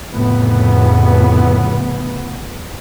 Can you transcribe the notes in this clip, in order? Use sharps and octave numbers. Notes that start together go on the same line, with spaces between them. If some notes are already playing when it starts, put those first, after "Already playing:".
F1 F2 A2 C#3 B3